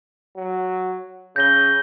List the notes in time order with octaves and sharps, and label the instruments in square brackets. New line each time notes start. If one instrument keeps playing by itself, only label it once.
[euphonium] F#3
[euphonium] C#3 [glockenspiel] G6 A#6 G7